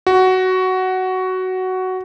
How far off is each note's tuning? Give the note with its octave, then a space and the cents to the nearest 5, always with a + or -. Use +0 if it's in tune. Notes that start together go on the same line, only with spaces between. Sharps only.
F#4 +10